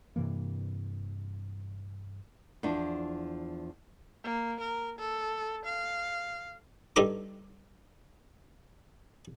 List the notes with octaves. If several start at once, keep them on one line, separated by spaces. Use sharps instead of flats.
G2 C3 E3 A#3
E2 F3 D4
A#3
A#4
A4
F5
G2 G3 D#4 A4 A#5 D6